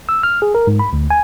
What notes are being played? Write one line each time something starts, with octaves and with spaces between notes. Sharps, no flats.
E6
F6
G#4
A#4
G#2
B5
D2
G#5